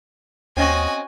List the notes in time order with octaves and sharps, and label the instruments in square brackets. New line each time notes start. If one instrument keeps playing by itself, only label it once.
[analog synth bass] D#2 [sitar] C4 C#4 D#5 [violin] F#4 G#5